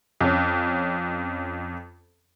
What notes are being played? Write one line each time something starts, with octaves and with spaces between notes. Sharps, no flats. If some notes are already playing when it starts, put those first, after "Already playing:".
F2 C#4